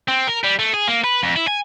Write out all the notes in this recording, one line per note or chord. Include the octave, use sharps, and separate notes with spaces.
C4
A#4
G3
A3
G#4
A#3
B4
F2
E4
G#5